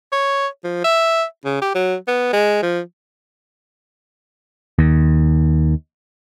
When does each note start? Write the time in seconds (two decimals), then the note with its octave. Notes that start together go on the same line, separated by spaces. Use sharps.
0.12 C#5
0.64 F3
0.84 E5
1.45 C#3
1.62 G4
1.75 F#3
2.08 B3
2.33 G#3
2.63 F3
4.79 D#2